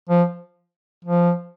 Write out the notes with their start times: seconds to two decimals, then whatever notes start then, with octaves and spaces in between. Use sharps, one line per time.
0.09 F3
1.04 F3